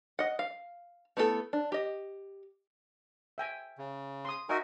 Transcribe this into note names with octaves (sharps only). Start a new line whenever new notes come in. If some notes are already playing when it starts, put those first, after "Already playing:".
D#5 F#5
F5
A3 B3 E4 F4 A4
D4
G4 D#5
E5 G5 G#5
C#3
C6 D#6
D#4 F#4 A#4 D#5 E5 G#5